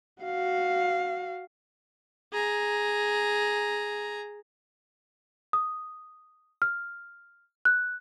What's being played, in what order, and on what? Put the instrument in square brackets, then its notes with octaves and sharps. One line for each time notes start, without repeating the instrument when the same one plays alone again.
[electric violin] F#4 F5
[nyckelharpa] G#4 A#5
[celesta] D#6
F6
F#6